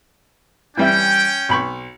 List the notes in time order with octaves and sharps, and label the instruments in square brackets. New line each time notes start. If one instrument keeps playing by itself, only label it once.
[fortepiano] E3 G3 E5 [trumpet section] C#4 G5
[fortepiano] B1 B5 C#6